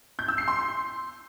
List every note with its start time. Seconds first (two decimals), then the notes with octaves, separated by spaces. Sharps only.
0.19 G6
0.28 E6
0.38 C7
0.48 C6